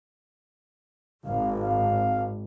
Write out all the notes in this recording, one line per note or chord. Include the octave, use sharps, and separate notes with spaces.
G#1 F5
F5